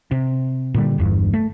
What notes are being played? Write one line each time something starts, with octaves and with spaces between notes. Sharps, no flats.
C3
A#2 D3 G3
G1 E2 G2
A3